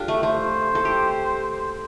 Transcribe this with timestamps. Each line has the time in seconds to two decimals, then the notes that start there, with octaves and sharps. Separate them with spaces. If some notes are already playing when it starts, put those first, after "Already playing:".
Already playing: D4 F4 G4 A4
0.08 A3
0.23 A3 C5
0.75 A4
0.85 G4